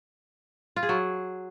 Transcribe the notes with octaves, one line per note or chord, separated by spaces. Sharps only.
F4
G#4
F#3